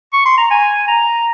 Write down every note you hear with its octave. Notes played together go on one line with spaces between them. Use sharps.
C#6
C6
A#5
G#5
A#5